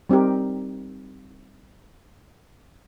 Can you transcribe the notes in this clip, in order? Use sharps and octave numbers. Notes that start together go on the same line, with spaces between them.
G3 C4 D#4 G4 A#4